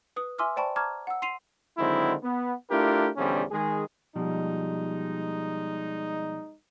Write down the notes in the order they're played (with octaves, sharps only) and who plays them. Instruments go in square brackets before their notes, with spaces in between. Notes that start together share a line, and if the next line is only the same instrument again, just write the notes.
[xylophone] B4 D#6
E5 G#5 C6 D6 E6 F6
C5 D5 G5 A5 B5 C#6
A5 A#5 C#6 D6 F6 G#6
F#5 E6
C6 C7 D#7 F7
[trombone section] D3 D#3 F#3 G#3 C4 E4
B3
A3 D4 E4 F4 G4 A#4
A#1 E2 D3 G3 C4 C#4
D#3 G#3 G#4
[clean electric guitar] B2 F3 G3 [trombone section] G#3 D#4